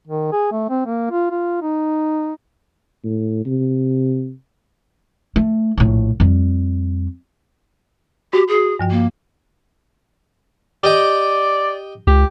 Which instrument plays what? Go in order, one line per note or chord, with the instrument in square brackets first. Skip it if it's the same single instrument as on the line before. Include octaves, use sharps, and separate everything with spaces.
[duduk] D#3
G#4
A3
C4
A#3
F4
F4
D#4
[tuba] A2
C3
[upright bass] A3
A#1 A2
F2 G3
[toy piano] F#4 [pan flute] G4
[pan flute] G#4
[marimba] G2 F3 G5
[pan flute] A#3
[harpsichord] G4 D#5 G5 [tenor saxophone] D5
[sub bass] C#2 [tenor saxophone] G4